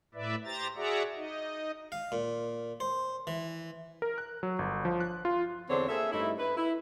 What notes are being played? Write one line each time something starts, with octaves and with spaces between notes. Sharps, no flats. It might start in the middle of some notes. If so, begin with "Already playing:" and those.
A2 B4 D5 E5
G4 C5 A#5 A6
F#4 G#4 D5 E5 F#5 A#5
D#4 D#5
F5
A#2
C5
E3
A#4
F#6
F#3
G1
F3
F#6
F4
E2 D3 C4 D4 C5 C#5
A#3 G#4 A4 E5
G2 A3 D#4 E4
B4
E4